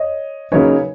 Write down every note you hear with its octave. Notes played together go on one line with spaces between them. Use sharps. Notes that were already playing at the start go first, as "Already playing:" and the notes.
Already playing: C#5 D#5
C#3 F#3 A#3 D#4 B4 C#5